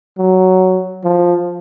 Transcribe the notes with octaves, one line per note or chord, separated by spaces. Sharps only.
F#3
F3